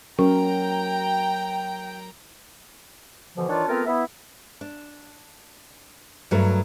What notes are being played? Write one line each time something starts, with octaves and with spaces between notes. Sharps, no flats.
F#3 C#4 A#4 G5 A#5
B2 D3 E3 F3
D#3 E3 D4 F4 C#5 D5
A3 B3 C4 F4 A#4 B4
B3 E4 E5
D4
G2 F#3 A3 A#4